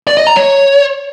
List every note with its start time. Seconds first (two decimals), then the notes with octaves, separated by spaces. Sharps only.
0.07 D5
0.17 D#5
0.27 A#5
0.37 C#5